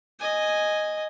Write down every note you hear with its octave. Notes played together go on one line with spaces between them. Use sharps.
D#5 G#5